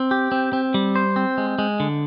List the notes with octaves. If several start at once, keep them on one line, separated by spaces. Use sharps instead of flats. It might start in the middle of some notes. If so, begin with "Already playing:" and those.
Already playing: C4
G4
C4
C4
G3
C5
C4
G#3
G#3
D3